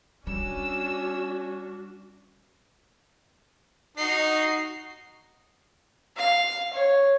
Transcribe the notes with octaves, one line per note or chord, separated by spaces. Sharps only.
G3 C#4 D4 F#4 E6
D#4 F#4 C7
F5
C#5